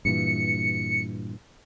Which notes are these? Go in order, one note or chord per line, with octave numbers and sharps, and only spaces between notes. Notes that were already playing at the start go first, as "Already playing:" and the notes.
G2 A#2 E3 C#7